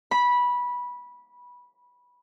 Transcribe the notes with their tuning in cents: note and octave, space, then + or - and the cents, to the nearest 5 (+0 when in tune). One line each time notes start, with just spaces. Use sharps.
B5 -15